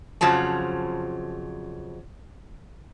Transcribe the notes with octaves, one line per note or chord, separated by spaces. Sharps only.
F2 C#3 F3 F#3 A5